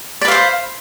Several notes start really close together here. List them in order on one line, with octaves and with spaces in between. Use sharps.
D5 B4 F5 C5